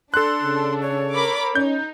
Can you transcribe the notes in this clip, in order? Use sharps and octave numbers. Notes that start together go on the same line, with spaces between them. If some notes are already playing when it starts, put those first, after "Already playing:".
D4 A4 C6 F#6
C#3
C#5
A#4 B5 D6
C#4 D#4 G6